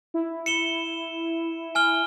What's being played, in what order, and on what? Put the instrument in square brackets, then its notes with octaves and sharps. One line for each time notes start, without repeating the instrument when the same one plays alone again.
[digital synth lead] E4
[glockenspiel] C#7 E7 G7
G#5 F6 G7